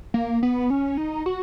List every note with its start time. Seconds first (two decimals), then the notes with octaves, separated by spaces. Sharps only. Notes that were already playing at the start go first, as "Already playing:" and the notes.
0.14 A#3
0.43 B3
0.70 C#4
0.97 D#4
1.26 F#4